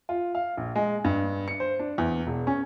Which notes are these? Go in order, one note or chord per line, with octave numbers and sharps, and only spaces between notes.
F4
F5
A#1
G#3
G2
C#7
C5
D4
E2
E1
C#4